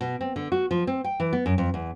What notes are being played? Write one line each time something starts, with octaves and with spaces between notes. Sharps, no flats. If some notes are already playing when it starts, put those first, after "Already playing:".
B2
C4
D3
F#4
F3
C4
G5
E3
B3
F#2
F2
E2